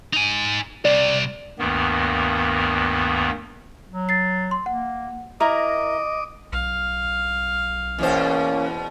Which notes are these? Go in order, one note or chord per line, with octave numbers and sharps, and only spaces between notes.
D#4 G#5
C2 C3 D5
D2 G2 D#3 A#3 B3
F#3
A6 C7
C6
A#3 F#5
E4 A#4 D#5 A#5 D6 D#6
B1 F5
E2 B2 A#3 C#4 C5